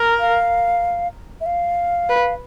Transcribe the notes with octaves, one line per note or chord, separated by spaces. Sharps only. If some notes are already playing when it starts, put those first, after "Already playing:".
Already playing: A#4
F5
E5
F5
B4